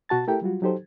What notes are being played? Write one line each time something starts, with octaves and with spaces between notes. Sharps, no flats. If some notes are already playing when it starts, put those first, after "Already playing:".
B2 F#4 A5 A6
A3 E4 G4 A4 A#4 G5
F#3 G3 F4 F#4
F#3 D#4 G4 A4 C5